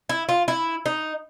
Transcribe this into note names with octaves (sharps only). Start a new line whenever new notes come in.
E4
F4
E4
D#4